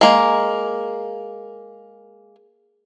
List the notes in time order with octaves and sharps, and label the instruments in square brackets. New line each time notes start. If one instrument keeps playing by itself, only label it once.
[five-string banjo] G#3 A#3